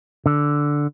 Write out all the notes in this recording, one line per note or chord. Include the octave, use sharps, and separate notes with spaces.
D3